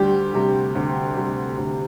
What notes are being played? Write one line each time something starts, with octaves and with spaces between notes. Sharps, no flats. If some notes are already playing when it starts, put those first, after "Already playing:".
Already playing: D2 G3 G4
C3 G3
D2
C3 G3
D2